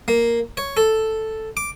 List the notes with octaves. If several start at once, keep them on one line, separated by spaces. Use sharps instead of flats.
A#3
C#5
A4
D6